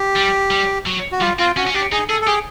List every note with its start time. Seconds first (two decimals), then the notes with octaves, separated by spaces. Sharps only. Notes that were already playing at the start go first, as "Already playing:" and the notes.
Already playing: G4
0.16 G3
0.51 G3
0.87 F#3
1.12 F#4
1.21 G3 F4
1.39 C4 F4
1.57 C#4 F#4
1.67 C#4
1.74 D4 G4
1.92 D#4 G#4
2.09 G#4 A4
2.21 A4
2.27 G4 G#4